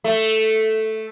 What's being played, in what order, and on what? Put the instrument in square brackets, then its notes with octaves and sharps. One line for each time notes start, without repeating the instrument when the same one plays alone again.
[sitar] A3